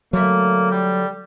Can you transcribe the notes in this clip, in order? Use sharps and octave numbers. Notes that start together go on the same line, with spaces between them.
D3 F#3 A3 A#3 E5
G3